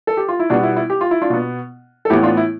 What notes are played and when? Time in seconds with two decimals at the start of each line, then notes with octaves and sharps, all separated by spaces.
0.07 A4
0.17 G4
0.28 F4
0.40 E4
0.50 B2 G3 B3 D4
0.63 E4
0.76 E4
0.90 G4
1.01 F4
1.11 E4
1.22 D4 F4
1.30 B2 B3
2.05 A4
2.10 A2 E3 B3 E4 G4
2.23 D4 F4
2.37 E4